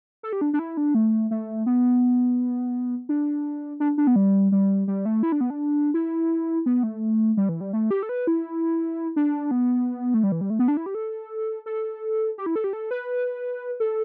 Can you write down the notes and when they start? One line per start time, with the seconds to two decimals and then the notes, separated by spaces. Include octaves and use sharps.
0.23 A4
0.33 G4
0.41 D4
0.53 D4
0.59 E4
0.77 D4
0.95 A3
1.31 A3
1.66 B3
3.09 D4
3.80 D4
3.98 D4
4.07 B3
4.16 G3
4.52 G3
4.88 G3
5.05 A3
5.23 E4
5.32 D4
5.41 B3
5.50 D4
5.94 E4
6.66 B3
6.83 A3
7.37 G3
7.49 E3
7.61 G3
7.73 A3
7.91 G4
8.03 A4
8.09 B4
8.27 E4
9.16 D4
9.51 B3
10.14 A3
10.23 G3
10.32 E3
10.41 G3
10.50 A3
10.59 B3
10.68 D4
10.77 E4
10.86 G4
10.95 A4
11.66 A4
12.38 G4
12.46 E4
12.56 A4
12.64 G4
12.73 A4
12.91 B4
13.80 A4